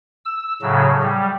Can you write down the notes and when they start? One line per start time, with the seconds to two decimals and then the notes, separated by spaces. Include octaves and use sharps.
0.25 E6
0.62 A2 C#3 F#3
1.02 G3